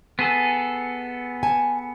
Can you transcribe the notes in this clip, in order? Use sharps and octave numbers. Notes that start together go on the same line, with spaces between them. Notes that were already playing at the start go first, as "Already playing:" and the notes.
B3 G#4 A4
G#5 A5